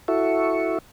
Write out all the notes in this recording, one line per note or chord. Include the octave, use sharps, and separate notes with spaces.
E4 F#4 A4 E5 C#6